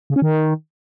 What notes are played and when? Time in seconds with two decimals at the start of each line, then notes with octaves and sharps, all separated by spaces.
0.10 C#3
0.16 C#4
0.22 D#3